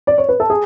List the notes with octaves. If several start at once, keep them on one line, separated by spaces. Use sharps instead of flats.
D5
C#5
B4
A4
G#4